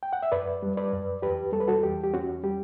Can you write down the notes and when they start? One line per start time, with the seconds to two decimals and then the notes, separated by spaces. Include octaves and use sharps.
0.03 G5
0.13 F#5
0.23 E5
0.32 F#2 B4 D5
0.63 G3
0.77 B4 D5
0.92 F#2
1.22 E2 G4 B4
1.52 G3 A4
1.60 B4
1.68 F#4 A4
1.83 E2 G4
2.04 G4
2.14 C#4 F#4
2.43 G3 G4